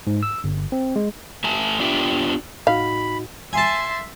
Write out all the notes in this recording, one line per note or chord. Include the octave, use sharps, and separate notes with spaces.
G#2
E6
G1
C4
G#3
A3 E5 G#5 A5
B3 D4 F4 G4 E5 G5
A2 D#4 F#4 F5 B5
E5 G#5 A5 C6